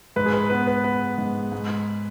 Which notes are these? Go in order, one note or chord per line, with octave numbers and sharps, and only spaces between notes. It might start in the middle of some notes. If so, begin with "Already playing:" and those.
G#2 B4
G#4
B4
B3 B4
B4
B3 B4
G#2
G#2